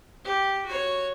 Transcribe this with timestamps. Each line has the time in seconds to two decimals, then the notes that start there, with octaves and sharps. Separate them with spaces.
0.25 G4
0.66 F#4 C#5